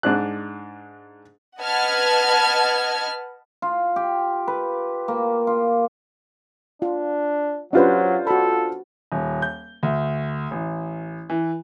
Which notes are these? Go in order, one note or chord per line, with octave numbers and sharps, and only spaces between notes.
G#2 D4 F#6
B4 D#5 F#5 A5 F6 G#6
F4
G4
B4
A#3
F4
D4 F4
F#3 C#4 D4 F4 G4 B4 C5
F#4 A4 B5
D#1
G6
D2
A1
E3